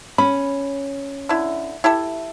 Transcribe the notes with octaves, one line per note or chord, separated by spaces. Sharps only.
C#4 B5
D3 E4
E4 G4 A4